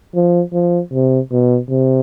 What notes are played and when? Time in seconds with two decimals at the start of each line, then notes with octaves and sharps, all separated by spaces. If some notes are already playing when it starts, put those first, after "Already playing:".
0.15 F3
0.53 F3
0.93 C3
1.32 B2
1.70 C3